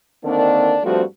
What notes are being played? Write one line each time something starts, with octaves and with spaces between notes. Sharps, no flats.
D3 D#3 A#3 C4 D4
G2 F3 G3 A3 C4 F#4